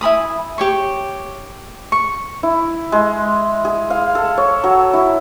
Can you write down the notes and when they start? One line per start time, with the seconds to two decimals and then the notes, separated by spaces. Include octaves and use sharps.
0.01 E4 G#5 B5 D#6
0.58 G4 C#5 C#6
1.92 C#6
2.43 E4
2.92 G#3
3.65 G#4
3.90 F5
4.15 A4
4.37 C#5
4.64 F#3
4.93 E4